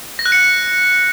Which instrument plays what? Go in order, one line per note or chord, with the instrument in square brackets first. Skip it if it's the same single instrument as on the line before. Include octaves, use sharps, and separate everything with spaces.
[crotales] A#6
F#6
C#7